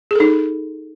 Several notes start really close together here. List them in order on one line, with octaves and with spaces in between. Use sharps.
G#4 A4 D#4